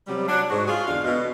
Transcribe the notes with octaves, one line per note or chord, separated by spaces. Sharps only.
C3 F#3 G3
F#3 D4
G#2 F#4
F4 G#4
E2 D3 D4 F5
B2